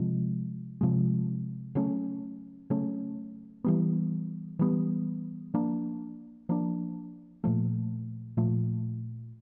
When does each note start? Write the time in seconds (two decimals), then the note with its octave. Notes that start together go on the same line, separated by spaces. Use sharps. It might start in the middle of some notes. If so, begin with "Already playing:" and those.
Already playing: C3 F3 G#3
0.81 C3 F3 G#3
1.75 C#3 F#3 A3 C#4
2.70 C#3 F#3 A3 C#4
3.64 E3 G3 B3
4.59 E3 G3 B3
5.54 F3 A#3 D4
6.49 F3 A#3 D4
7.44 A#2 F3 A3
8.37 A#2 F3 A3